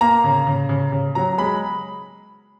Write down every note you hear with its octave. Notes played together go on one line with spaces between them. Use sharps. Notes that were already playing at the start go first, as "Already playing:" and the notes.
A#3 A#5
C#3
C#3
C#3
C#3
F#3 A#5
G#3 B5